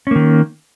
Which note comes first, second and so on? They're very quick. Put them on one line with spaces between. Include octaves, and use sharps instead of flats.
C#4 A#3 D#3